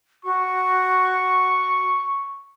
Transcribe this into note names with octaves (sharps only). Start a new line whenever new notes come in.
F#4 C#6